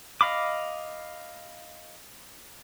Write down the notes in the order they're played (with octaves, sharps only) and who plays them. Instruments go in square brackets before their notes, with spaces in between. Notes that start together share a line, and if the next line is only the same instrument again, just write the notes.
[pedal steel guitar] D#5 F5 B5 D6